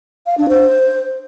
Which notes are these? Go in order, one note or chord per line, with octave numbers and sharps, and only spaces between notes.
F5
D4
C5